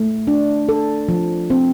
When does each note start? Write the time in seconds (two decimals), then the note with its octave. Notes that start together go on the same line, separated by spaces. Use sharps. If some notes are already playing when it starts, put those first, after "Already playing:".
Already playing: A3
0.27 D4
0.69 A4
1.09 F3
1.50 C4